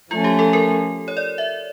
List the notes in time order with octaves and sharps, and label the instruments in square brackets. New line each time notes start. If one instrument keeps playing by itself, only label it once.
[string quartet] F3 A3 C#4 [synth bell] F4
[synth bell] G4
A4
A#4
C#5
D5
E5